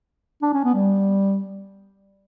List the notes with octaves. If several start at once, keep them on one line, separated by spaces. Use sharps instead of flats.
D4
C#4
B3
G3